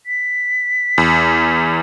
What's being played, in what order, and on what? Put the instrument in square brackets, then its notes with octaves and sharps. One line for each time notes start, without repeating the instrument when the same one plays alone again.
[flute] B6
[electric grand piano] E2